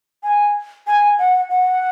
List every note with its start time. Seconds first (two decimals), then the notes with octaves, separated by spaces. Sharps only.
0.23 G#5
0.87 G#5
1.19 F#5
1.50 F#5